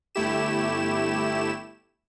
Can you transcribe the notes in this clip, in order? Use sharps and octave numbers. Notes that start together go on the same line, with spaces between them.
G1 A3 E4 G4 E7